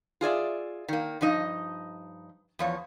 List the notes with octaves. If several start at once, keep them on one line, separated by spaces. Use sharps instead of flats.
F4 G#4 D5 E5
D#3 A#3
G2 F3 D#4 D#5
E2 F3 C#5